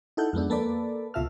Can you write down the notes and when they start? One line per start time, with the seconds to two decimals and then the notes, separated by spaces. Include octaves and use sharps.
0.17 D#4 E4 A4 F#5 G6
0.33 F2 G#3 B3 D4
0.50 A#3 A4 B4 D5
1.14 C#2 B2 F4 E5 A5 F6